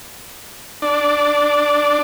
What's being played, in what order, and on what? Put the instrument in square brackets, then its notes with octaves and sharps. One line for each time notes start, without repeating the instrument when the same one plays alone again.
[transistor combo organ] D4